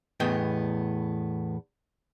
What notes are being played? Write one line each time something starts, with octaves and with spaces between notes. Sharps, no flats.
E2 A2 B3 D#5 G5